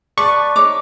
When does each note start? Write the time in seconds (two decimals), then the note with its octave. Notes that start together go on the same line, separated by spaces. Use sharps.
0.18 B4 D5 A5 C#6
0.56 D#4 C#5 D6